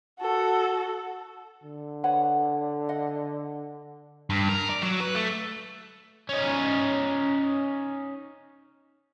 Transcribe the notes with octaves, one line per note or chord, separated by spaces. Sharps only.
F#4 A4
D3
B4 C#5 F#5
D#5 F#5
G2
A#4
D5
F#3
B4
A3
C#4 D#4